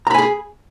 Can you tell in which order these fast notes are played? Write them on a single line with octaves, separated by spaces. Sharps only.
A#5 B5 G#5 G#4